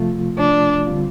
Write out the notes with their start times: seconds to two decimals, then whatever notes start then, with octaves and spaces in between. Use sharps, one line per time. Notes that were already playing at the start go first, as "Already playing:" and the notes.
Already playing: C3 F3 A3 F4
0.38 D4
0.87 D3 G3 C4 F4